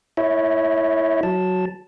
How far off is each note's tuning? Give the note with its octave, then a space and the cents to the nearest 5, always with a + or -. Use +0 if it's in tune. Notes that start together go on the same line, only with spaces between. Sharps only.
E4 +0 C#5 -5 E5 -40
F#3 +0 A5 +0